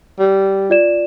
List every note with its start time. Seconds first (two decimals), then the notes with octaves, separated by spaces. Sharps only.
0.19 G3
0.70 F4 D5 E7